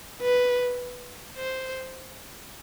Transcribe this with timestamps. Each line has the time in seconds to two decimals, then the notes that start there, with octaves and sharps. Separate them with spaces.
0.22 B4
1.37 C5